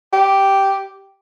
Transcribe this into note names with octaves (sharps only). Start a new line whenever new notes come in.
G4